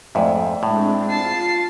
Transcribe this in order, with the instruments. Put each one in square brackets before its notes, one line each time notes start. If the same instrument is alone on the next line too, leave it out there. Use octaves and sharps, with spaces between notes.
[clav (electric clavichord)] F2 G#2 [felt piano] A3 D5 E5
[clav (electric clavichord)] A2 [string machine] G#3 C4 D4
[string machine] F4 [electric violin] A5 C7